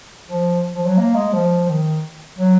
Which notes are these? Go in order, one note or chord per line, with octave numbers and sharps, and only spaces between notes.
F3
F3
F#3
A#3
G#3
F3
D#3
F#3